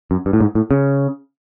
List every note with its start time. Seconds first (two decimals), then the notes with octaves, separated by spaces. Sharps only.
0.11 F#2
0.26 G2
0.33 A2
0.40 G#2
0.55 A2
0.71 C#3